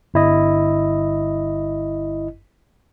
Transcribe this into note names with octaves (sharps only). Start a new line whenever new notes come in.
G1 E4 D#5